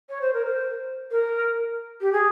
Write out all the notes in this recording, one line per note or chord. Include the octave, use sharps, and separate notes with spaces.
C#5
C5
A#4
C5
A#4
G4
G#4